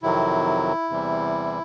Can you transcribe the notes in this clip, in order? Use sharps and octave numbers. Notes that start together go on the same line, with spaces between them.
F2 C3 D#3 F#3 E4
E2 C3 E3 G3